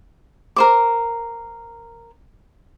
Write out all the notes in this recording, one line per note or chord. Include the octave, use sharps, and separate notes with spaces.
A#4 C5 D6